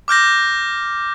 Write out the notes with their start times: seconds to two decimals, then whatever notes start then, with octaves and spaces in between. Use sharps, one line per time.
0.08 D6 F6 G6 A#6